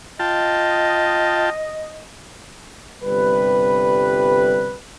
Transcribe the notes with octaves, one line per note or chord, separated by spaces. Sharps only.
F4 D#5 G5 A5
G1 C3 G3 B4